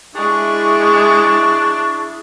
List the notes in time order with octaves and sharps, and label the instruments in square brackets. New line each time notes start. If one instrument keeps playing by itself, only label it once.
[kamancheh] G#3 [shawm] D4 [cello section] E4 G#4 [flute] C#6